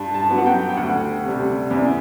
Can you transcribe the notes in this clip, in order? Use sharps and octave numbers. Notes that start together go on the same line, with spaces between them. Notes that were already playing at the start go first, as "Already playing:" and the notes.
Already playing: G2 A5
A5
F#3 B3
F#5
G5
G5
D2 F#5
C3 G3
E2